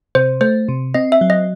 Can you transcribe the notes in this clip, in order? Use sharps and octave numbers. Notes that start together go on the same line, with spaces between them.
C3 C5
A3 C5
C3
C4 D#5
E5
F#3
D#5